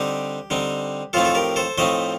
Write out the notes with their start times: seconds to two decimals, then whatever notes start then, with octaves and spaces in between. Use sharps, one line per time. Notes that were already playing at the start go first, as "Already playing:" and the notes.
Already playing: D3 G3 C4 D#4 G4
0.50 D3 G3 C4 D#4
1.13 A2 F3 A3 C4 D#4 F4 A4
1.25 A4
1.35 G4 A#4
1.56 A4 C5
1.78 A2 F3 A3 C4 D#4 C5 D#5